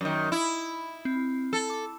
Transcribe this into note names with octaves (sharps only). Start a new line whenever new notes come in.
F#2 D#3
E4
C4
A4
D6